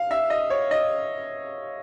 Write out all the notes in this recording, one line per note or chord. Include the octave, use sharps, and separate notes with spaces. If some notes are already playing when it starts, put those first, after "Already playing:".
Already playing: F5
E5
D#5
C#5
D#5